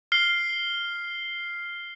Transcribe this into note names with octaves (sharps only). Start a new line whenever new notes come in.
F6 C7 G7